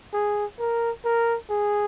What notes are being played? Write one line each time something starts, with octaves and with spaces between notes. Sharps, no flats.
G#4
A#4
A#4
G#4